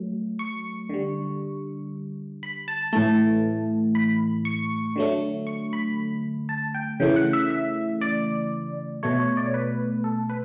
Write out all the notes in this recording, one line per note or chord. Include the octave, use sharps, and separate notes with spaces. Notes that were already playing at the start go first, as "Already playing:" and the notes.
Already playing: F#3 A3
C#6
D3 G3
B5
A5
A2 E3 A3 A5
B5
C#6
D3 F#3 A3
C#6
B5
A5
G5
C#3 E3 A3 G5
F#5
E5
E5
D5
B2 A3 C#5
C#5
D5
C#5
B4
A4
B4